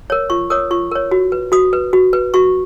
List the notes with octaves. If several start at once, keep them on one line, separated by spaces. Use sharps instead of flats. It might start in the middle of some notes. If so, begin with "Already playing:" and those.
A#4 C#5
F4 C#6
A#4 C#5 D#6
F4 C#6
A#4 C#5
F#4
B4
F#4 D#6
B4
F#4
B4
F#4 C#6